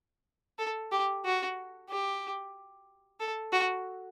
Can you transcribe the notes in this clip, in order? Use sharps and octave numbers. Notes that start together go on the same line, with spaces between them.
A4
G4
F#4
G4
A4
F#4